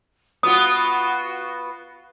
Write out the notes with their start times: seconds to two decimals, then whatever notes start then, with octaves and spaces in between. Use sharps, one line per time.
0.43 B3 F4 F#4 D#6